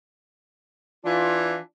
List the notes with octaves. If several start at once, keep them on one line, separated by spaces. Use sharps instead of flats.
E3 D4 F4